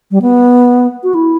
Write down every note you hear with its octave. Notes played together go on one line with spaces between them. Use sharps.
G3
B3
F#4
E4